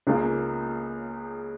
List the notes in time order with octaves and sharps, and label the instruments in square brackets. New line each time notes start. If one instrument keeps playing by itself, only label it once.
[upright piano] C#2 C#3 A#3 F4